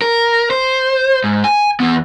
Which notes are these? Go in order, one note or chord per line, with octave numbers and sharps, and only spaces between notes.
A#4
C5
G#2
G#5
E2 B3